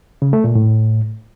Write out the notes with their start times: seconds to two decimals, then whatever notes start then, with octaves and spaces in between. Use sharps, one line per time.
0.22 C#3
0.33 A3
0.44 A#2
0.55 A2